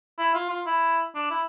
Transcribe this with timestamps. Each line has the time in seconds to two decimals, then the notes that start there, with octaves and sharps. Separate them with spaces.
0.19 E4
0.35 F4
0.50 F4
0.67 E4
1.15 D4
1.31 E4